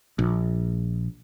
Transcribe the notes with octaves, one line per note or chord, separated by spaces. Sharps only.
A#1